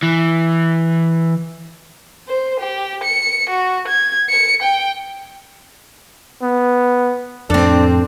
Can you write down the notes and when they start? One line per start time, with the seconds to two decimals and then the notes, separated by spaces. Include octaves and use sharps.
0.03 E3
2.28 C5
2.60 G4
3.04 C#7
3.50 F#4
3.88 G#6
4.30 C#7
4.62 G5
6.42 B3
7.50 F2 A2 C4 D4 A4